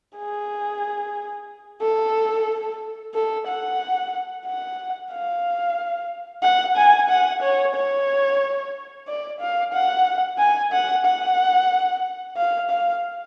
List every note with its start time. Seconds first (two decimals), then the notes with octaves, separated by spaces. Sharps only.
0.17 G#4
1.81 A4
3.14 A4
3.47 F#5
4.46 F#5
5.12 F5
6.43 F#5
6.76 G#5
7.10 F#5
7.42 C#5
7.75 C#5
9.08 D5
9.40 F5
9.73 F#5
10.38 G#5
10.72 F#5
11.05 F#5
12.37 F5
12.70 F5